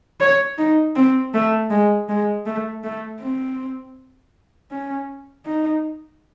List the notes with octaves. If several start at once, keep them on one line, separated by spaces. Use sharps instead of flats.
C#5
D#4
C4
A3
G#3
G#3
A3
A3
C4
C#4
D#4